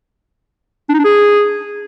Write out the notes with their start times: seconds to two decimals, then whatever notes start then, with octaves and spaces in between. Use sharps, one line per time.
0.89 D4
0.94 D#4
0.99 D4
1.04 G#4